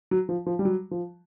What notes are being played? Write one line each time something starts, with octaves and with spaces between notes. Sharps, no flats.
F#3
F3
F3
G3
F#3
F3